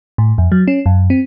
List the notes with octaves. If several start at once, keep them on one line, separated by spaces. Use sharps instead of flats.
A2
F2
F#3
C#4
F#2
C4